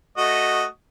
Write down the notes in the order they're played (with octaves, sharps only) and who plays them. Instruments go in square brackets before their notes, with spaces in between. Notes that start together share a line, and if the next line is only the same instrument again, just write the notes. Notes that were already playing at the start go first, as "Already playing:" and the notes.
[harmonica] A3 F#4 D#5